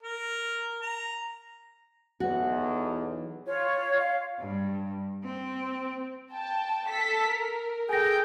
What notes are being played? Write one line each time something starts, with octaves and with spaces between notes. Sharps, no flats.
A#4
A#5
B1 E2 F#4
F4 C#5
F5
G2
C4
G5 A5
A4 B6
A#4
G#4 A4 G5 G#5 A#6